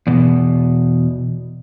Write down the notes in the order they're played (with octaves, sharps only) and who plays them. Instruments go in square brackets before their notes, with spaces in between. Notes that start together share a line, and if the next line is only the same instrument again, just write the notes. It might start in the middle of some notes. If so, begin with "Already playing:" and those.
[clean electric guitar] E2 B2